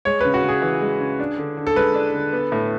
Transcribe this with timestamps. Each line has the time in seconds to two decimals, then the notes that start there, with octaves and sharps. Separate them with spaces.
0.05 G#3 C#5
0.21 C#3 B4
0.34 F#4
0.43 C#3
0.49 G#4
0.62 E3
0.82 G#3
1.00 C#3
1.20 D4
1.38 D3
1.57 D3
1.67 A4
1.76 G#3 B4
1.95 D4
2.14 D3
2.33 B3
2.52 A2